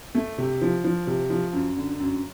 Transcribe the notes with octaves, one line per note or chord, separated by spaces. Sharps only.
A3
C3
F3
F3
C3
F3
F#2
D3
F#2